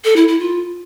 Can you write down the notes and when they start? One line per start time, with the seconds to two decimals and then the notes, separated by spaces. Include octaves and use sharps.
0.05 A4
0.16 E4
0.28 E4
0.40 F4